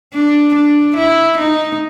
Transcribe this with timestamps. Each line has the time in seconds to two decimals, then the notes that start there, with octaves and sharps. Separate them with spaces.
0.14 D4
0.55 D4
0.96 E4
1.38 D#4